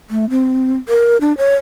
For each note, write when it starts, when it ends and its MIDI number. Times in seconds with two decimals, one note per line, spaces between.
0.10 0.28 57
0.30 0.76 60
0.89 1.18 70
1.21 1.36 62
1.38 1.55 73